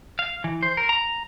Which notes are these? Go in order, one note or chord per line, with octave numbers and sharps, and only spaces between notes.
F5
E3
C5
A#4
A#5